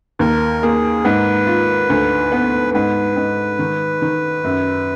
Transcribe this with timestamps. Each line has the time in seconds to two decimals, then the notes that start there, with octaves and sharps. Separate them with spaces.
0.19 D#2 A#4
0.63 A#3 G#4
1.05 G#2 B4
1.47 F4
1.90 D2
2.32 B3
2.74 G#2 B4
3.16 G#2
3.59 D#3
4.02 D#3
4.44 F#2